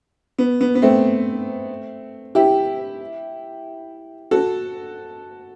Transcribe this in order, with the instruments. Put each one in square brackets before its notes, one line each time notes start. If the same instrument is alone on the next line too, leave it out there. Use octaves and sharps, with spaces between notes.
[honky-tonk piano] B3
B3
B3
A3 C4
E4 G4
F#4 A4